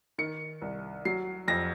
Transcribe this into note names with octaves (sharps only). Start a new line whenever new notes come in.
D#3 C#7
C2
F#3 C7
F2 A#6